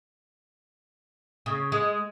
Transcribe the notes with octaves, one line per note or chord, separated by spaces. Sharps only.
C#3
G#3